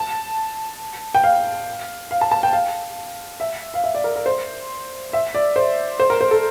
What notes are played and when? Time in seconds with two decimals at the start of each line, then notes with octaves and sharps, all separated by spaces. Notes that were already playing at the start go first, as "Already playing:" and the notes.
Already playing: A5
1.15 G5
1.24 F5
2.11 F5
2.21 A5
2.31 A5
2.43 G5
2.53 F5
3.40 E5
3.74 F5
3.84 E5
3.95 D5
4.04 A#4
4.16 A#4
4.26 C5
5.13 E5
5.34 D5
5.56 C5
6.00 C5
6.10 A#4
6.21 C5
6.31 A4